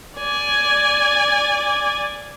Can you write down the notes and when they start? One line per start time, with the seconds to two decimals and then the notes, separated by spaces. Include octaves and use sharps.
0.19 D5 G#5